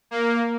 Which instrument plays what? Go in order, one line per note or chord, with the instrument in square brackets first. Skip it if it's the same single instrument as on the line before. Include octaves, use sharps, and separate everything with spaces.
[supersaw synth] A#3